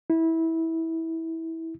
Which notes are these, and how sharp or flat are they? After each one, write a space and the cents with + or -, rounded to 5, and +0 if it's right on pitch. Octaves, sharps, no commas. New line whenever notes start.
E4 -20